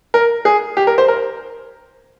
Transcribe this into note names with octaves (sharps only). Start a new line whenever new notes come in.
A#4
G#4
G4
A#4
C5
A#4